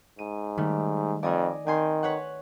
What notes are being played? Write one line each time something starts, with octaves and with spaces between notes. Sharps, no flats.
G#2 D#7
D#3 G3 A3
F2 D5 D#5 G#5
D#3 C4 G#5 C6
B4 C#5 F#5